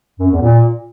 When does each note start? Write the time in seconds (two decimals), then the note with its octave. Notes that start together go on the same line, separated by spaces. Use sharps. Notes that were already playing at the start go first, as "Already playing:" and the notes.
0.19 F#2
0.30 E2
0.42 A#2